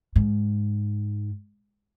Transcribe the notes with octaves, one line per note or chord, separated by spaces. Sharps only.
G#2